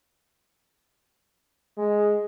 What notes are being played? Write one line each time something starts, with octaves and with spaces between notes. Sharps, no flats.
G#3